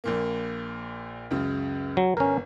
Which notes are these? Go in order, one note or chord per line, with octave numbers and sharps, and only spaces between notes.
A#1 A#2 A#3
C#2 F#2 C#3
F#3
G1 C#4 A#4